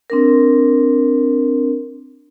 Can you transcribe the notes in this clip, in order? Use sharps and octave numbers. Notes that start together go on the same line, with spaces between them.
C4 D4 A#4